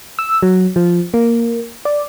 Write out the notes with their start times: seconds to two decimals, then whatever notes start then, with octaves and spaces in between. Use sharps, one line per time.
0.19 E6
0.42 F#3
0.76 F3
1.14 A#3
1.85 D5